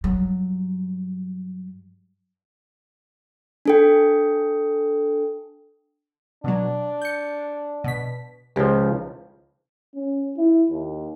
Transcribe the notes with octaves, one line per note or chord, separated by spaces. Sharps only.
G2 F#3
D4 A4 G5
B2 F#3 D4
G6 C#7
B2 B6
C#2 F3 G4
C#4
E4
D#2